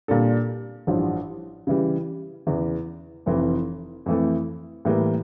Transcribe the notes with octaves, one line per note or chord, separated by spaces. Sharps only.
A#2 G3 D4 A4
A1 G2 F3
C#3 E3 G3
E2 C#3 E3
F1 F2 E3
F2 E3 A3
A2 E3 G3 A#3